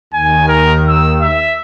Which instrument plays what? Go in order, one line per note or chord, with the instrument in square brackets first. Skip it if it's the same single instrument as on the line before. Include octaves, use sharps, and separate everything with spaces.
[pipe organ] D#2 D#3 [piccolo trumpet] G#5
[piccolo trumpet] A#4
E6
E5